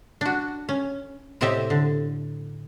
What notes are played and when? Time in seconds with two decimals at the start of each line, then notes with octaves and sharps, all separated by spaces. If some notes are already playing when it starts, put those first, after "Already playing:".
0.21 D4 F#4
0.69 C#4
1.41 A2 C3 C4 G4 D#5 E5
1.70 D3